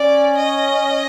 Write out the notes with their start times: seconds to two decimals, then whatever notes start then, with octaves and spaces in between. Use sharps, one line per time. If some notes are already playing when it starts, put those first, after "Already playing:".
Already playing: C#4 D5
0.37 D#5